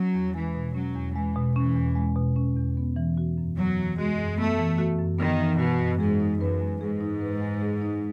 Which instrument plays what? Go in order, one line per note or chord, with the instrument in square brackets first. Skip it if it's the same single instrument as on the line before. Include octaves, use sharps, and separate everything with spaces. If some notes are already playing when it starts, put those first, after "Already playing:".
Already playing: [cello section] F#3 [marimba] C#4
[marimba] E2
[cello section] E3 [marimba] G#3
[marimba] B2
[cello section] F#3 [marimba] C#4
[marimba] E2
[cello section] E3 [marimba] G#3
[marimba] B2
[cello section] E3 [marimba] C#4
[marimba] E2
G#3
B2
C#4
E2
B3
E3
F#4
F#2
[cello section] F#3 [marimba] B3
[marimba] E3
[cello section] G#3 [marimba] F#4
[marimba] F#2
[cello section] A3 [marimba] B3
[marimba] E3
F#4
F#2
[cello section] D#3 [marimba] B3
[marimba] E3
[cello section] B2 [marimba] F#4
[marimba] F#2
[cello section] G#2 [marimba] G#4
[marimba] D#4
[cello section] F#2 [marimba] B4
[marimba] G#3
[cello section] G#2 [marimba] G#4
[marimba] D#4
B4
G#3
G#4
D#4